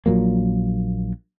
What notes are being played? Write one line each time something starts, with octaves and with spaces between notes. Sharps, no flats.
A#1 A#2 F#3 A#3